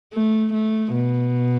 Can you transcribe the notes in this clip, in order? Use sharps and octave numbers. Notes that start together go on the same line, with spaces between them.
A3
A3
B2